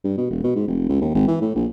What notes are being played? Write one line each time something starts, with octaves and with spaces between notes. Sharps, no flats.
G2
B2
E1
B2
G#2
F1
C#2
D#2
G#1
E3
A2
A#1